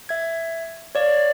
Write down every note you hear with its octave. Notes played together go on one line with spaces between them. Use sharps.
E5 G#6
C#5 D5 F5